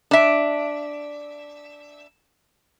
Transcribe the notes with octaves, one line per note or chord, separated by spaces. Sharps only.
D4 E5